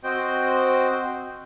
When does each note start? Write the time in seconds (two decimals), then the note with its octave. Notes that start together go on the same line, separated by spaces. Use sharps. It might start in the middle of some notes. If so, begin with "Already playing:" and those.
0.04 C4 F#4 C5 D#5 G5 G6